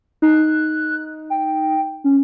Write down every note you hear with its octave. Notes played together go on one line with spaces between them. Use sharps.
D#4 F#6
G5
C#4